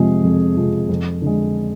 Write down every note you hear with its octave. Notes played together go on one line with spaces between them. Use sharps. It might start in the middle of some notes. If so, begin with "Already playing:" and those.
Already playing: F2 C3 F3 G#3 G#4
F2
C3 F3 G#3
F2
D3 G#3